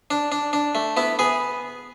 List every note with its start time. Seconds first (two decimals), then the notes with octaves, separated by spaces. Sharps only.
0.11 D4
0.32 D4
0.53 D4
0.75 A3
0.97 B3 E4
1.19 B3 G#4